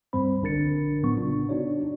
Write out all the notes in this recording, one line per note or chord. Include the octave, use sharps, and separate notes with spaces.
C#2 G2 G3 C4 C5 B5
A#1 D3 D4 A#4 A6 C#7
A2 F#3 B3 C#6
C#3 D4 F4
D4 D#4 F#4 C#5 D5